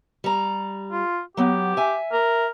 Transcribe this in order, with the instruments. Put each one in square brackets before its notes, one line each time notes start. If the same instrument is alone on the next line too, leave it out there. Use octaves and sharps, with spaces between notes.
[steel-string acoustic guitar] G3 A#5
[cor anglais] F4
[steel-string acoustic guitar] F#3 B3 [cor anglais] G4
[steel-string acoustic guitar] E5 G#5
[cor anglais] A#4